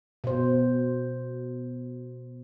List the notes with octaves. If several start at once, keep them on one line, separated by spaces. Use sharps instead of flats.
B2 C5